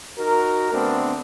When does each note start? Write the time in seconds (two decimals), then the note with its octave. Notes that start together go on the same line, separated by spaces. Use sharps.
0.19 D#4 F#4 A#4
0.73 D3 A3 B3 C4 D4